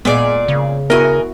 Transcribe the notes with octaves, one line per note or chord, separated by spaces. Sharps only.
A#2 G#3 B3 G#4 D5
C#3
B3 E4 F#4 A#4 D#5 G#5